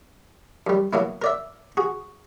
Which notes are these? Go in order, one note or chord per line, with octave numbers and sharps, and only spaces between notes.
F#2 G3
B2 F#3 A#3 E4
A#4 D5 E5
F#4 G#4